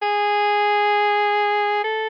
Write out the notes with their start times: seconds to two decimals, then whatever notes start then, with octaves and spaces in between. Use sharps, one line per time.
0.02 G#4
1.84 A4